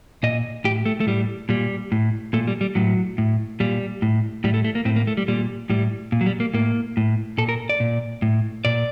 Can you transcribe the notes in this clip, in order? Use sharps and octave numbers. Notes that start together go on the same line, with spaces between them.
A#2 D#5
A2 G4
A3
A3
A2 G3
A#2 G3
A2
A#2 A3
G3
G3
A2 F#3
A2
A#2 G3
A2
A2 G3
A3
A3
A#3
A2 C4
A#3
A3
G3
A#2 G3
A2 G3
A#2
F#3
G3
A#3
A2 A#3
A2
A#2 A4
A#4
D5
A#2
A2
A#2 D5